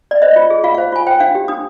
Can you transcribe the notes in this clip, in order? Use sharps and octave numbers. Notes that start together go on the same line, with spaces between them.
D5
C5 D#5
F4
G#4
F4 F5
F5
C5
F4 G#5
C5 G5
D4 F5
G4
D4 D#6